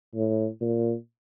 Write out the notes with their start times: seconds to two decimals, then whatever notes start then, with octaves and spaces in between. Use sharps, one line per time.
0.15 A2
0.61 A#2